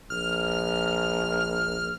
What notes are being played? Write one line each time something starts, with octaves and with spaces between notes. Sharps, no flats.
A#1 F6